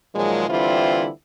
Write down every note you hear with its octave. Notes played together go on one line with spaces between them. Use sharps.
A#2 D#3 F3 F#3 G#3
D3 E3 G3 C4 E4 F4